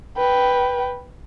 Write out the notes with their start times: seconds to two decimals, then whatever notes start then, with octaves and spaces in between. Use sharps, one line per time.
0.18 B4 G5